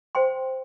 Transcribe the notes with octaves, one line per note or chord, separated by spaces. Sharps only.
C5 G5 C6